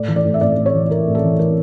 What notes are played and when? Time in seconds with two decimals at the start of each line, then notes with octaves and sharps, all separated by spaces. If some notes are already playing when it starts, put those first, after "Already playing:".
Already playing: A2 D5
0.08 E3
0.16 D5
0.25 A2
0.34 E5
0.41 A2 D5
0.57 A2
0.66 C#5
0.74 E3
0.90 E3 A#4
1.07 A2
1.15 A4
1.24 E3
1.39 E3 A#4